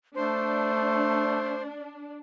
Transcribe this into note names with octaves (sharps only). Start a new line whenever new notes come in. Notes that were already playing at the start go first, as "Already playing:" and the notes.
A3 D4 C5